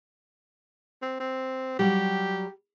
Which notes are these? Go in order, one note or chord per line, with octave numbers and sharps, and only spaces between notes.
C4
C4
F#3 G3 G4